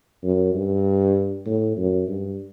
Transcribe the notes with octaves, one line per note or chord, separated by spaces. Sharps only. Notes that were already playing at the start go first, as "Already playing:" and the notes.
F#2
G2
A2
F#2
G2